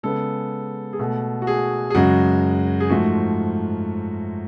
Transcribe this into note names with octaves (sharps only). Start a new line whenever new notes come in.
C#3 G#3 B3 A4
G#4
B2 A3 A4
F#4
G#4
G#4
F#2 C#3 G#3 F#4
G#4
G#2 F3 A3 F#4